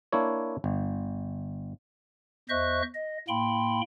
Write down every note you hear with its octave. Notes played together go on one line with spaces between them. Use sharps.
A#3 D4 E4 C#5
G1
E2 C5 D#5 E5 C#6 F#6
D#5
A2 A#3 G5 B5 C6